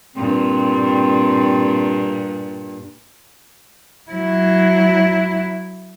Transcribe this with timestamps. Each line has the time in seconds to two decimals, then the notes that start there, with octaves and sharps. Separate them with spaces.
0.16 G2 A#2 C4
4.12 F#3 E4